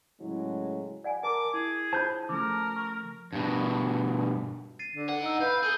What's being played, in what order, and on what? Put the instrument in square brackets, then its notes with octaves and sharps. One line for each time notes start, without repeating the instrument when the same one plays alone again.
[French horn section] A2 C#3 F#3 G#3 E4
[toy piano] D5 F#5 G#5
[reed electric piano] A#4 A5 [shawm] D6
[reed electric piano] E4 [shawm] G#4
[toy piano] F4 C5 [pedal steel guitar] A5 G6
[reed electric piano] C#3 F3 A3 [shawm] A#4 [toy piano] D6
[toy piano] C#6
[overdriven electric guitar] G2 B2
[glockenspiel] A6 C7 D#7
[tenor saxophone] D3
[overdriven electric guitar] G2 F#5
[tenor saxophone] D#4 [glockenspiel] E6 D7
[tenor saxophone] B4 [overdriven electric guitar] F5 [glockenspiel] G6
[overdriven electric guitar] G#4 [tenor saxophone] A4 [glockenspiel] G6 D#7 G7